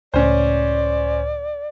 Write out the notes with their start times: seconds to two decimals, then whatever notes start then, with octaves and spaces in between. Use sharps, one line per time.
0.14 C#2 A2 C#4 C5 D5